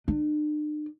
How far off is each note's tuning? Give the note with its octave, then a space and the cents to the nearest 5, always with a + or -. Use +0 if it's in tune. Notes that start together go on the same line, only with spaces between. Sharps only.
D4 +45